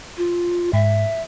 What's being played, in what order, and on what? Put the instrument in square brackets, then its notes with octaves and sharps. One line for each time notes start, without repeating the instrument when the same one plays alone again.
[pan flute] F4
[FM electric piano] G#2 [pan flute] E5